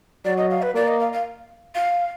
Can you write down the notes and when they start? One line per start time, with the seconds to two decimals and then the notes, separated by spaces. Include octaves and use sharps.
0.25 F#3 D5
0.37 D#5
0.50 F5
0.62 B4
0.75 A#3 D5
0.88 D#5
1.00 F5
1.13 F5
1.75 F5